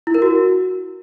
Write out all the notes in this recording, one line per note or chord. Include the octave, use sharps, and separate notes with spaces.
E4
A#4
F#4